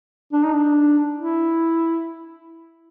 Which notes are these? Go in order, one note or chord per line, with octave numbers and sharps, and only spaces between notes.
D4
D#4
D4
E4